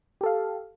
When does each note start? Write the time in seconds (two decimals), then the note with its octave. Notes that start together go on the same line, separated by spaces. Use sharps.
0.21 G4
0.23 A4
0.26 F5